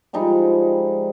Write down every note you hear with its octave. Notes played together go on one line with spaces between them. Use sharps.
F3 G3 G#3 D#4